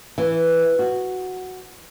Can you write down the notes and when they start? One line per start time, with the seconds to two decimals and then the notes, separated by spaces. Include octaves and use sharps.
0.18 E3
0.79 F#4